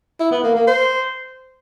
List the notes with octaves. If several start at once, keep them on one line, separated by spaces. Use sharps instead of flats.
E4
B3
A#3
A#3
C5